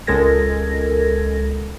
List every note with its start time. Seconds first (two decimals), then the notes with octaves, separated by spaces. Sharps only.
0.07 C#2 G#3 A4 A#4 G#6 A#6